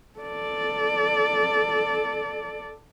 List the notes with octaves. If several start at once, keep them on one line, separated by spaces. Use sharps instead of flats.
A4 D5